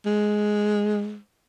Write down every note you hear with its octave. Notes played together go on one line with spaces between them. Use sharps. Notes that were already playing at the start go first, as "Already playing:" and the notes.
G#3